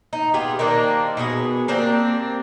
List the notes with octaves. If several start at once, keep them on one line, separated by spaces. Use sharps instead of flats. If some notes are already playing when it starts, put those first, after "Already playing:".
D#4
B3 F4 G4 G#4
D#3 A#3 C4 D4
B2 B3 D#4 G#4
A#3 C4 D4 G4